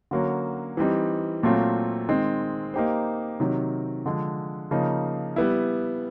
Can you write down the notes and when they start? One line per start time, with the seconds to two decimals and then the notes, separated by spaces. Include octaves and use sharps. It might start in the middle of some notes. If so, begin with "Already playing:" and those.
0.11 D3 F#3 A#3 C#4 F#4
0.77 E3 G3 C4 D#4
1.43 A#2 F#3 A3 C4 F4
2.09 D#3 G#3 C4
2.74 A#3 D#4 G4 C5
3.40 C3 D#3 F#3
4.06 D3 F3 G#3
4.71 C#3 F3 A#3 D#4
5.36 G3 B3 E4